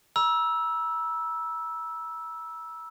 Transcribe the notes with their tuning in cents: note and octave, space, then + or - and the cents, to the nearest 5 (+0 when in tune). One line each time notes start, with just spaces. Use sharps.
A#5 +45 E6 -5